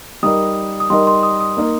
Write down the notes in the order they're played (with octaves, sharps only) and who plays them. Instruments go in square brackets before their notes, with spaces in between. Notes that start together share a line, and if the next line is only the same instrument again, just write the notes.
[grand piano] G3 D#4 A#4 D#5 [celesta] D#6
[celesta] D#6
[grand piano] G3 D#4 A#4 D#5 [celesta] C6
[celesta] C6
D#6
D#6
[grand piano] A#3 D#4 A#4 D#5